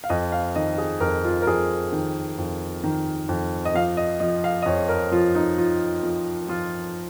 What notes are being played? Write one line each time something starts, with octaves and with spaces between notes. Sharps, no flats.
F5
F2 D#5
F5
D#3 D#5
G#4
F2 A#4
F4
A#4
F2 G#4
D#3
F2
D#3
F2
D#5
F3 F5
D#5
F3 D#5
F5
D#5
F2 C#5
A#4
F3 F4
D#4
F3 F4
F3
F3 F4